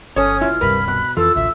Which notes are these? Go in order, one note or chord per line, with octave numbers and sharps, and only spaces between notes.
G1 C#4 A4 C#5 D#6
B1 E4 F4 F6
D1 G2 C3 G3 A#4 B4 B5
B2 F#6
F2 E3 F4 A4 E6
A1 D2 E5